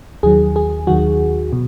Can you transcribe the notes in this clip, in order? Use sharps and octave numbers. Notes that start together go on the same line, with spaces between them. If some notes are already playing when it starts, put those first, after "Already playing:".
D#2 D#3 F#3 G#4
G#4
D#2 D#3 F#3 F#4
B2